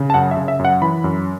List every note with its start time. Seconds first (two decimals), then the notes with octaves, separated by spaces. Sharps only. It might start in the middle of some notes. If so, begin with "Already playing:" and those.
Already playing: C#3
0.10 A5
0.14 F#2 F#5
0.31 E5
0.37 C#3
0.48 E5
0.59 F#2
0.65 F#5
0.82 E3 B5
1.04 F#2